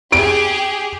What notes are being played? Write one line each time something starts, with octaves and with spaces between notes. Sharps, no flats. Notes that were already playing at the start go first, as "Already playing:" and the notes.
G4 G#4 D7